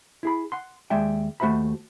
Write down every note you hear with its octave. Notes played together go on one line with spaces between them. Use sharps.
E4 G#4 B5
F#5 C6
D#2 G#3 D5 E5 G5
D#2 A3 F#4 C5 E5 B5